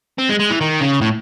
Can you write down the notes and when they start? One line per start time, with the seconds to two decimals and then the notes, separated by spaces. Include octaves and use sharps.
0.19 C4
0.29 G#3
0.40 G#3
0.50 E3
0.61 D#3
0.81 C#3
1.01 A2